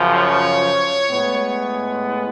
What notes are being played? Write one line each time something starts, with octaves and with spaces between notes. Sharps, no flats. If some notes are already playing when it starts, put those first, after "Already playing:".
Already playing: F#2 C#3 F3
C#5
A2 G#3 B3